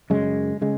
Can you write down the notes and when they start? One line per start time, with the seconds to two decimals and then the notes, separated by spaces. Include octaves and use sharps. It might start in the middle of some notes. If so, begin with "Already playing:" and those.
0.10 F#2 C#3 G#3
0.62 C#3 G#3